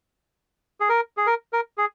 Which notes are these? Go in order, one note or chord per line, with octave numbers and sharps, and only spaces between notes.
G#4
A#4
G#4
A#4
A#4
G#4